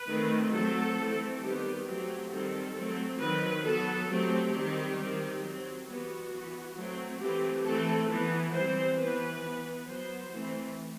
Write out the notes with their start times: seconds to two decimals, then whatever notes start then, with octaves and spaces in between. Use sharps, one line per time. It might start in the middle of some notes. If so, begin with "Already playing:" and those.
Already playing: B4
0.09 D#3 A3 C4
0.53 F#3 A3 C4 A4
0.98 E3 A3 C4
1.42 D#3 G3 B3 G4
1.86 F#3 A3 C4 G4
2.31 D#3 G3 C4 A4
2.75 F#3 A3 C4
3.20 D#3 F#3 C4 B4
3.64 F#3 B3 A4
4.08 F#3 A3 C4 G4
4.53 D#3 G3 C4
4.97 D#3 G3 C4
5.42 F#3 C4
5.86 E3 G3 B3 F#4
6.30 E3 B3
6.75 F#3 A3 C4
7.20 E3 A3 C4 G4
7.64 E3 A3 C4 A4
8.09 E3 B3
8.53 E3 G3 C4 C5
8.97 E3 B3 B4
9.42 E3 B3
9.86 F#3 B3 C5
10.30 E3 A3 C4